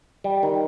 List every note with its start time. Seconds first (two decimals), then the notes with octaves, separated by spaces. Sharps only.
0.24 G3
0.43 D#3